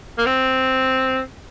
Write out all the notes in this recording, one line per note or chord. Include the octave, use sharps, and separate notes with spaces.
A#3
C4